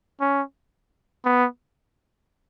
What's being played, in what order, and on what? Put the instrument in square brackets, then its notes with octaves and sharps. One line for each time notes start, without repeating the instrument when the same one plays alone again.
[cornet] C#4
B3